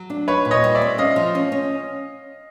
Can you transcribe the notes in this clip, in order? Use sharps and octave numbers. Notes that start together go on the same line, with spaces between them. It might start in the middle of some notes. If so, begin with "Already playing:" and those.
Already playing: F#3
D4
D#4 B4 C#5
A#2
C#5 D#5
G3
D5 E5
C4
C#4 D#5 F5
F3
C#4
C#4